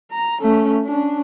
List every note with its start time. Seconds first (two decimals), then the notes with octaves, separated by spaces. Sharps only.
0.12 A#5
0.42 A3 C#4
0.85 C#4 D4